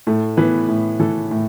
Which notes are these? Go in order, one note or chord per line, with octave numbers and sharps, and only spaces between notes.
A2 A3 A4
E3 B3 B4
A2
E3 A3 A4
A2